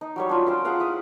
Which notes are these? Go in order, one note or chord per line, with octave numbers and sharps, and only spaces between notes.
D#4
F#3 G3 C#5
D4 F4
C#4 A4 C5 G5
G#4 F5 F#5 A#5
E4 D#6